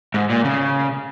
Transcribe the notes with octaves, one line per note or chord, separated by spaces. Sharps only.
G#2
A#2
C#3